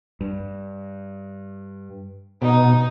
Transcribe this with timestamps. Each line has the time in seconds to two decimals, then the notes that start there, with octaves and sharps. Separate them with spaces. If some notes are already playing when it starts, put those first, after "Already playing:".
0.21 G2
2.42 B2 D#4